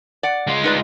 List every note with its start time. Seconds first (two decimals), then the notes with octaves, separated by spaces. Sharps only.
0.23 D5 F#5
0.47 G#3 F4
0.64 D#4 B4 D5